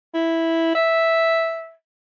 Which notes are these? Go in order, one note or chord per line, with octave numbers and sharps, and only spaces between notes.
E4
E5